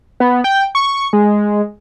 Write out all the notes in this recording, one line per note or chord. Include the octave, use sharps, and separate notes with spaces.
B3
G5
C#6
G#3